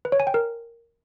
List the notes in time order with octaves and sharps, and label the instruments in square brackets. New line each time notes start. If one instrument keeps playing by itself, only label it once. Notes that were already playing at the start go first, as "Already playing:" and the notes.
[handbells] B4
C#5
G#5
G5
A#4